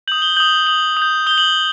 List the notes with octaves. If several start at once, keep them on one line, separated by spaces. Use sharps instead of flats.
D#6 G6 F#7
G7
D#6 G6 F#7
D#6 G6 F#7
D#6
G6
D#6 G6 G7
F#7